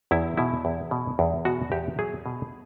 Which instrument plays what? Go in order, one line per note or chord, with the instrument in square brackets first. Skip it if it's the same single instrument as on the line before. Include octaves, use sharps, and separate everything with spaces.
[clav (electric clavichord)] E2 E4
B2 E4
E2
B2
E2
B2 F#4
E2 G4
F#3 G#4
B2